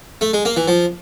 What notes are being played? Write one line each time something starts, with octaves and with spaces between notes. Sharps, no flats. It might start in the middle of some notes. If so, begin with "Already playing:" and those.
A3
G#3
A#3
E3
F3